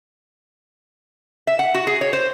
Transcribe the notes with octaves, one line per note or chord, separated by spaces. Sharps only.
E5
F#5
F#4
G#4
C#5
C5